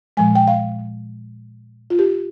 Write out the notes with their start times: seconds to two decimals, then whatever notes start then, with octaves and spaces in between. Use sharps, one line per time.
0.17 A#2 F3 G#3 G#5
0.35 G5
0.48 F5
1.90 F4
1.99 G4